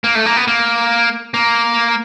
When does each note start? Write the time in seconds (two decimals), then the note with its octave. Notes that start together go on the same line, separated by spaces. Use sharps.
0.04 A#3
0.15 A3
0.26 A#3
0.36 B3
0.47 A#3
1.34 A#3